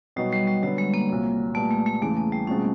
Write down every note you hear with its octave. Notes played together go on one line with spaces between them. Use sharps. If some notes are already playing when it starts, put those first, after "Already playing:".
B2 F#3 G3 B3 D#4 F#4
G3
G3
D3 F#3 G3 B3
G#3
A#3
C2 A#2 F#3
A#2 G3 A3 B3
G#3
G#3
E2 C#3 E3 A3
A#3
G3
B2 G#3 C4 C#4 F4